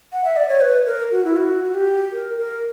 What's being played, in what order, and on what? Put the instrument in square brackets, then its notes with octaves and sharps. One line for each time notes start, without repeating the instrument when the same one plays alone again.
[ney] F#5
E5
D5
C#5
B4
A#4
F#4
E4
F#4
F#4
G4
A#4
A#4